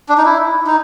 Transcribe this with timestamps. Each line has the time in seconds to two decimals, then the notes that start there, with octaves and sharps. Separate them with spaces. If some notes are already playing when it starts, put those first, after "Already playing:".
0.09 D4
0.18 D#4
0.25 E4
0.67 D#4